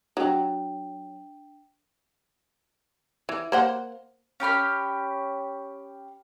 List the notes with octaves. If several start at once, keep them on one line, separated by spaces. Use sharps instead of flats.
F#3 D4 G5
E3
A#3 C5 F#5
C#4 G4 B5 F6